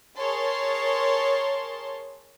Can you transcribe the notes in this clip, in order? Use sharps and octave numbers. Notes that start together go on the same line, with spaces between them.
G#4 A#4 C#5 A5 C6